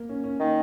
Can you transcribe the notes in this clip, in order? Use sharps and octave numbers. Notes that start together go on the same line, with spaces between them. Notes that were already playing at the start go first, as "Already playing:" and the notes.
Already playing: A#3
C#4
C#4
D#3 A#3